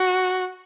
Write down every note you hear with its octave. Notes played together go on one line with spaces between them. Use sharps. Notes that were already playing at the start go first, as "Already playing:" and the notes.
Already playing: F#4